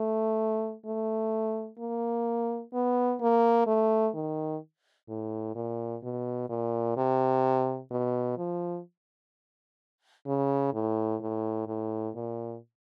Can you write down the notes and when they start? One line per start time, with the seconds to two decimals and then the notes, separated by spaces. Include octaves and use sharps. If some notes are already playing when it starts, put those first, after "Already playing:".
Already playing: A3
0.86 A3
1.79 A#3
2.73 B3
3.21 A#3
3.67 A3
4.14 D#3
5.08 A2
5.55 A#2
6.03 B2
6.49 A#2
6.97 C3
7.91 B2
8.37 F3
10.27 C#3
10.73 A2
11.21 A2
11.67 A2
12.15 A#2